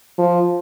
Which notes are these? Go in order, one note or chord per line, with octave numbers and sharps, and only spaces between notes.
F3